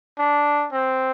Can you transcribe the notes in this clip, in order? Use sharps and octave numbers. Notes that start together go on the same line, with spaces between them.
D4
C4